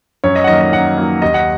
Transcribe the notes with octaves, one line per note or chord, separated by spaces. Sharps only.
F#2 C#5
D#5
F#5
D#3 F#3 A#3 D#5
D#5
F#2 F#5
D#3 F#3 A#3
D#2 D#5
F#5